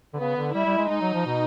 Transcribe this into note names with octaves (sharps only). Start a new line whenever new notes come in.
D3
C#3 B3
D3
G3 E4
G3
G#3
G#3 D#4
F#3
F3
B2